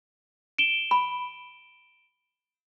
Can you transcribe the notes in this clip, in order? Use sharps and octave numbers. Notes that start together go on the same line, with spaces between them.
D7 E7 G7
B5